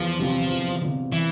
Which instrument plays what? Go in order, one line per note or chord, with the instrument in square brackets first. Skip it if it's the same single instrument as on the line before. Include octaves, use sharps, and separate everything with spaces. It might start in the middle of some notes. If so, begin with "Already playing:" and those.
Already playing: [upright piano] E2 [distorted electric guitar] F3
[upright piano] C3 G3 C4 F4
E2
C3 G3 C4 F4
[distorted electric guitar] E3